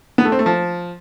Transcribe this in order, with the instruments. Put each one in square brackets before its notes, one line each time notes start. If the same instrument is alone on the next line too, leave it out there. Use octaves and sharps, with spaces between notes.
[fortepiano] B3
A3
C4
A3
F3